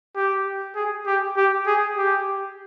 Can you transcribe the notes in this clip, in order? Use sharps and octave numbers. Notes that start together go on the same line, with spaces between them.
G4
G#4
G4
G4
G#4
G4